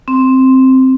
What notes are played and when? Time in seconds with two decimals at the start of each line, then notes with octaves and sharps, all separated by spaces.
0.08 C4